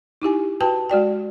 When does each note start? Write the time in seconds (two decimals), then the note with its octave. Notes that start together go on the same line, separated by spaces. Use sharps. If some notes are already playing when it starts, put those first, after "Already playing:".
0.22 D#4 E4 G4 G#5
0.60 F#4 B4 G5 A5
0.90 G#3 F#4 D5 G5